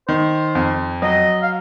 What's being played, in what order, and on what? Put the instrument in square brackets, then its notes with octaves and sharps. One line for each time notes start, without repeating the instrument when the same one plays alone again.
[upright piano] D#3 [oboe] C5
[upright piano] F2
[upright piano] F#3 [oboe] D#5
[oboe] F5